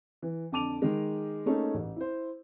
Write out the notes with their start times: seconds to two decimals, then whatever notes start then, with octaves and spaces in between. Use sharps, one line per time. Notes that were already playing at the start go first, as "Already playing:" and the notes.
0.22 E3
0.52 F2 D3 A5 D6 D#7 F7
0.82 D#3 G#3
1.46 A3 A#3 C#4 D#4 G#4 A4
1.74 A1
1.96 E4 C5